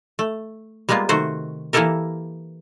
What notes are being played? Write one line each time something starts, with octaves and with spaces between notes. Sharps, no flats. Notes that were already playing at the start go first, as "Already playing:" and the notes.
A3
G3 G#3 A#3 B3 F4
C3 D#3 A3 F#4 C5
E3 A#3 E4 G4 A4 A#4